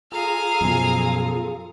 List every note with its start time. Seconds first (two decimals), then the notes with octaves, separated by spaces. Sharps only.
0.12 F4 G#4 A4 F5 G#5 A#5
0.61 F#2 B2 F3